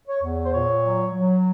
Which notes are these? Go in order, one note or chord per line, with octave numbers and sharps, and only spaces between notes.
C#5
E2
C5
A#2 C#5
F#3
F#3